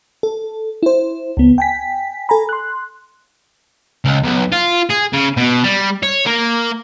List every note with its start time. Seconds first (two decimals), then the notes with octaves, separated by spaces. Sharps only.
0.23 A4
0.83 E4 C5
1.37 C#2 B3
1.58 G5 G#5 B6
2.29 A4 G#5 A#5 B5
2.49 C6 F#6
4.05 C#2
4.23 B1
4.52 F4
4.91 G#4
5.13 C#3
5.37 B2
5.64 G3
6.03 C#5
6.26 A#3